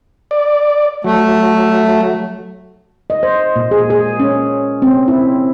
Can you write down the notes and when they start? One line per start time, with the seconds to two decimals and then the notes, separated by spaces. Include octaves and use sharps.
0.31 D5
1.04 F#3 A3
3.10 D#5
3.23 C5
3.56 A#2
3.71 G#4
3.90 G#4
4.20 C#4
4.82 C4
5.08 E4